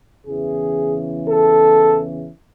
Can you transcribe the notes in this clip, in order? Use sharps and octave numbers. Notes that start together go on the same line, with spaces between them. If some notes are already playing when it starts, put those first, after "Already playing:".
E2 C#3 E3 G#4
A4